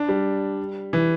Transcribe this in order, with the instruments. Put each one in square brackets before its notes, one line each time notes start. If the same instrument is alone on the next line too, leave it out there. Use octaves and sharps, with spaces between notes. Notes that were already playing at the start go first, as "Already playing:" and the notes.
Already playing: [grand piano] D4
G3
E3